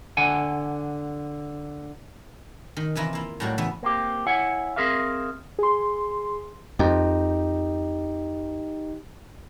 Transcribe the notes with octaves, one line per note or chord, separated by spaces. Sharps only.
D3 F#5 G#5
D#3
C3 E3 E4 F4 A#4
A#3 E4 F4
A2 F#3 G3 A#3 F#4 D5
C#3 E3 B3 E5
A#3 C4 G4
E4 C#5 E5 F#5 G#5
C4 G#4 A#4 E5 F5
G#4 C6
F2 D#4 G4